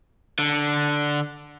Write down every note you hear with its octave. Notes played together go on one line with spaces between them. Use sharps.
D3